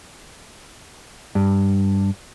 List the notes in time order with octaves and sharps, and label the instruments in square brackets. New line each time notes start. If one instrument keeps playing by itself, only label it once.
[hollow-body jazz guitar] G2